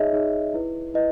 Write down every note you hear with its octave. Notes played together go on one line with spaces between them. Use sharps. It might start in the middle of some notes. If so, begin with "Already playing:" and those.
Already playing: D#4 G#4 C#5 D#5 E5
D#4 G#4 C#5
E4 B4
E4 B4 D#5